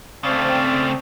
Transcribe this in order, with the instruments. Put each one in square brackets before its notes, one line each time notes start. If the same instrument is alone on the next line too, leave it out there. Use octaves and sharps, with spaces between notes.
[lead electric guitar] C#3 A3 [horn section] C4 [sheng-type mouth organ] D5 F5